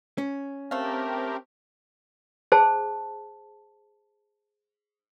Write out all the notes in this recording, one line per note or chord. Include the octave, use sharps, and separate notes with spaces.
C#4
A3 C4 G4 A#4 F5
G#4 C5 A5